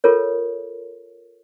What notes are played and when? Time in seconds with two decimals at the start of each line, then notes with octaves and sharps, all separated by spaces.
0.04 F4 A4 A#4 C#5